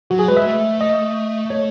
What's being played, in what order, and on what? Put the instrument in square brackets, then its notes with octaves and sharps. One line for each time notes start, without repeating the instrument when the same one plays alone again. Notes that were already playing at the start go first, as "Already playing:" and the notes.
[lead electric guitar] F#3 [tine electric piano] F#4
[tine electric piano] G#4
[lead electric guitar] G#3 [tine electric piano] B4
[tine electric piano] E5
[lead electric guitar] A3
[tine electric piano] D#5
[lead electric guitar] A3 [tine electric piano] C#5